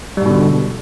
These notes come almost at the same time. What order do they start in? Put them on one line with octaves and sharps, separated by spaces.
G3 G#2 B2 D3